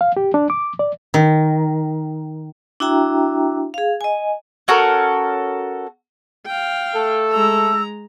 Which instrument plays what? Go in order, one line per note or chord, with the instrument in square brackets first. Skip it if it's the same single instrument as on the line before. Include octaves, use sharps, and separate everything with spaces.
[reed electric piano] F5
G4
D4
D6
D5
[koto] D#3
[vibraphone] D4 E4 F#4 E5 G5 A#5
G#4 F5
D#5 G#5
[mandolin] C#4 F#4 A4 A#4
[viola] F5 G5
[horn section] A3 A4
[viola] G#3 A#5 [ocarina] E6